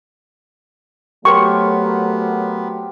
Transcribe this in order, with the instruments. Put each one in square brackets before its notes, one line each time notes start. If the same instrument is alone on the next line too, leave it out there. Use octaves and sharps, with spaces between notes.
[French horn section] F#3 A3 [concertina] B3 [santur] G4 A#4 C5 [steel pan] C#6